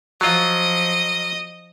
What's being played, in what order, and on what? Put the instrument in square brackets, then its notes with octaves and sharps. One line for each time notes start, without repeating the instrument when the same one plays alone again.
[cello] F3 [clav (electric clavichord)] F#3 F4 [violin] D#5